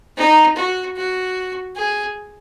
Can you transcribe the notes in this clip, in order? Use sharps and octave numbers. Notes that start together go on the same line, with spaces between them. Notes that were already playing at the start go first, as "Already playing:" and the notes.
D#4
F#4
F#4
G#4